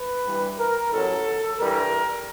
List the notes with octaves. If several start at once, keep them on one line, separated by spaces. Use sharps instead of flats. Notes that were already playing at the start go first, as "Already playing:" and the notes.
Already playing: B4
G2 E3 G3
A#4
A1 A2 F#3 A4
G2 E3 G3 A#4